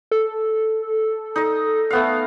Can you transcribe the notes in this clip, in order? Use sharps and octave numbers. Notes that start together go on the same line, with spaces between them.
A4
D#4 D#5
A3 B3 F5